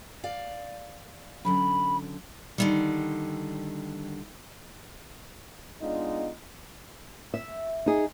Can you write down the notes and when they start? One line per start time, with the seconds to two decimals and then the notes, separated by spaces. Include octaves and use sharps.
0.24 D5 F5
1.45 D3 F#3 C#4 B5
2.58 D3 D#3 G3
5.81 G#3 B3 D4 D#4 F4
7.34 E5
7.86 D#4 G#4